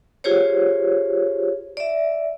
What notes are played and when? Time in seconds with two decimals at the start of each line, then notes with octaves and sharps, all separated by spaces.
0.24 F4 G4 G#4 C5 C#5
1.77 D5 E5